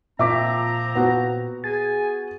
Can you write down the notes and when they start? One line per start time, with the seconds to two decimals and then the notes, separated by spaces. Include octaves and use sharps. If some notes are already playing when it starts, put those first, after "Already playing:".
0.19 A#2 F3 C4 E5 A#5 D6 B6
0.95 B3 F#4
1.64 G#4 G#5 A6